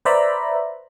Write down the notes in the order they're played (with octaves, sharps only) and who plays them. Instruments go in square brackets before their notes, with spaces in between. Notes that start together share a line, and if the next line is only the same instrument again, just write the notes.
[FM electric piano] B4 C5 D5 E5 A#5 B5